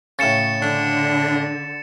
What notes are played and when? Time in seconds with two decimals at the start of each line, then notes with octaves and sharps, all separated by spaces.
0.19 A2 C#3 A6 C#7 E7
0.62 D3 D4